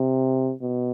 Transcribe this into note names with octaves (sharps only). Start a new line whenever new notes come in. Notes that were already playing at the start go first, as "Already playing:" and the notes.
Already playing: C3
B2